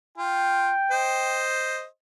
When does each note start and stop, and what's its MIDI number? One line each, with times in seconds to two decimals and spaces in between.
0.18 0.71 65
0.18 1.45 79
0.91 1.85 72
0.91 1.85 75